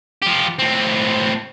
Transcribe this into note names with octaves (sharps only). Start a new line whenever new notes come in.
F3 G4
A2 C4